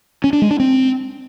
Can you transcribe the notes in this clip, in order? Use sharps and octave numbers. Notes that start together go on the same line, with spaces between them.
C#4
D4
G#3
D4
C4